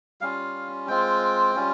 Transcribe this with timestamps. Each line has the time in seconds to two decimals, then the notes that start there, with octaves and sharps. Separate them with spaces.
0.21 G3 C#4 F4 F5
0.88 G#3 C4 F4 G5
1.55 G3 C#4 F4